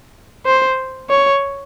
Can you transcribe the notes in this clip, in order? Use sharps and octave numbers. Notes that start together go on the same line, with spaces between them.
C5
C#5